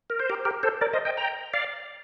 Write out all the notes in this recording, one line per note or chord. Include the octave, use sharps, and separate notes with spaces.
A#4
C5
G4 A#4
G4 A#4
A4 C5
A#4 D5
C5 D#5
D#5 G5
G5 A#5
D5 F5